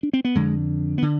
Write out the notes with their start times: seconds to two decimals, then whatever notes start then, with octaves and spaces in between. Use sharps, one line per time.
0.03 D4
0.13 C4
0.25 B3
0.35 F2 D3 G#3
0.98 B3
1.02 D3